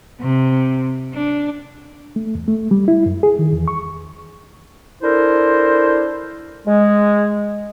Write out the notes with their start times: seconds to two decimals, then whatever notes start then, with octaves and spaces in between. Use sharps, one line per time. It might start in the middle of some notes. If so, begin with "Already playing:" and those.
0.20 C3
1.14 D4
2.16 A3
2.35 E2
2.48 A3
2.71 G3
2.88 E4
3.06 F#2
3.23 G#4
3.39 D#3
3.52 E2
3.68 C#6
5.03 D4 E4 A4 A#4 C5
6.67 G#3